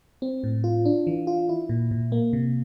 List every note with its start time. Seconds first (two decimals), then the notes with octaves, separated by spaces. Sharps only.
0.22 C4
0.44 A2
0.64 F4
0.85 D4
1.07 E3
1.27 F4
1.49 E4
1.69 A#2
1.91 A#2
2.12 A#3
2.33 C3